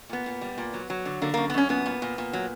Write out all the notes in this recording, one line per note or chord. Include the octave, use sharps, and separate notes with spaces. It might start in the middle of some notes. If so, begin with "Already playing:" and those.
A#2 B3
A#2
G3
A#2
F#3
F#3
D3
D3 A#3
F#2 A#3
B3
F#2 C#4
A#2 B3
A#2
A#2
A#2
F#3